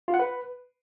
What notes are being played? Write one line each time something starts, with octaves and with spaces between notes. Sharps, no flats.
F4
F#5
B4